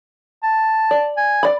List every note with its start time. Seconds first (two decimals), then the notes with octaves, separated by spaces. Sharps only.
0.43 A5
0.91 D5
1.17 G#5
1.43 D5 B5